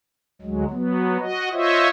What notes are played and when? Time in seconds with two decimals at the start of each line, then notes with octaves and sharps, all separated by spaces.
0.42 D2 F#3 G#3
0.70 F#3 B3
1.20 F#4 D#5
1.52 F4 C5 C#5 D#5 E5